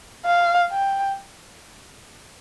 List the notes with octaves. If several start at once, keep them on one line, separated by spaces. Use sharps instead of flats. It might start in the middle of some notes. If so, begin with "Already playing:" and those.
F5
G5